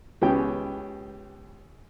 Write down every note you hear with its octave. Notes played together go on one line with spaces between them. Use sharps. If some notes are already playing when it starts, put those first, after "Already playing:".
C#2 B3 C#4 G4 G5